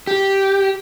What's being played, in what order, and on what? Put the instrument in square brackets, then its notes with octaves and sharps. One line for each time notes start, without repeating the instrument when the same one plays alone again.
[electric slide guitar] G4